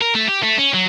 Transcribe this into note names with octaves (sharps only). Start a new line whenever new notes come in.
A#4
A3
G4
A3
C#4
F#3